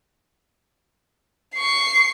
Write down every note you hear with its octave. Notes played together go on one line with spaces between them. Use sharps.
C#6 C7